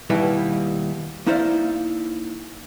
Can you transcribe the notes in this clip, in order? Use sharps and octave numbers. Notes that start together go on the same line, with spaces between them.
D#2 B2 G3 E4 B4 E5
A#3 D#4 E4 C5 D5 F5